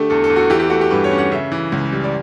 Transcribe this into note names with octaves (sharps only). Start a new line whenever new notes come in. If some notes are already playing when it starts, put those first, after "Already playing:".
Already playing: D3 A3 G4
E2 A4
A4
E2
F#4
E3 G4
G4
A3 F#4
G4
G2 B4
C#5
C#4
F#5
C#3 E5
E3
C#2
G3
D5